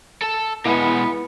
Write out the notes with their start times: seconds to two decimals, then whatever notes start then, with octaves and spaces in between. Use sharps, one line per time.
0.22 A4 A5
0.65 B2 G#3 B3 E4 B5